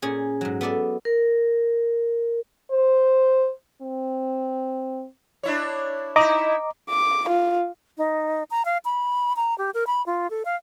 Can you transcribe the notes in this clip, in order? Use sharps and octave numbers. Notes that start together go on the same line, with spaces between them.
A#2 C#4 G#4
G#2 F#3
B3 A4 D5 E5
A#4
C5
C4
D4 E4 C#5
D#4 E4 D#5 A#5 D6
D6
F4
D#4
A#5
F5
B5
A#5
G4
A#4
B5
F4
A4
F5